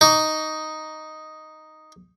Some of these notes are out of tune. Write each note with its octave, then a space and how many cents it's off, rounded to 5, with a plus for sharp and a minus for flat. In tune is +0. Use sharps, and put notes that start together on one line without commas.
D#4 +0 D6 -45